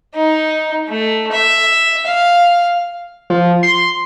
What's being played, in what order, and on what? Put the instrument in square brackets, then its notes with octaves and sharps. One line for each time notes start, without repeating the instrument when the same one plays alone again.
[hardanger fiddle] D#4
A3
E5
F5
[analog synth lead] F3
C6